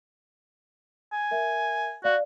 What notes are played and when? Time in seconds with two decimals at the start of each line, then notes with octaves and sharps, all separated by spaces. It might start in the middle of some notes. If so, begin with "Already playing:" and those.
1.12 G#5
1.31 A#4 E5
2.04 F#4 D5 F5